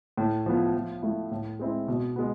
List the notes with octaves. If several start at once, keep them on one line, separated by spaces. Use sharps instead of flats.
A2
F3 B3
F3
A3 E4
A2
G#3 C4 E4
B2
G#3 B3